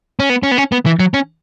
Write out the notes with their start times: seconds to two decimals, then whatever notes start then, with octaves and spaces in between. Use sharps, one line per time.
0.20 C#4
0.30 B3
0.43 C#4
0.51 B3
0.58 C#4
0.72 B3
0.86 E3
1.00 F#3
1.14 C#4